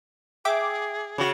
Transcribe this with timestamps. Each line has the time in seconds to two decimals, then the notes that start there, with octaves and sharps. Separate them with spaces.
0.45 G#4 E5 G5 D6
1.18 C#3 F#4